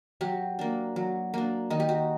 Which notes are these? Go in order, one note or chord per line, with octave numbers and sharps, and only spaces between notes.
F#3 G4
A#3 D4
F#3
A#3 D4
D#3 D#4
G4
F#4